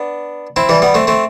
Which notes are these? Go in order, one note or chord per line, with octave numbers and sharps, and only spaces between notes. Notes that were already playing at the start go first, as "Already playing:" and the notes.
Already playing: B3 D4
C4 E4
E3 G3
G3 B3
A3 C4
A3 C4